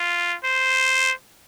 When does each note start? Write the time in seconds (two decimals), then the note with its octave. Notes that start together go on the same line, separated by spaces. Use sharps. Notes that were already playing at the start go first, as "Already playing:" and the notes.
Already playing: F4
0.44 C5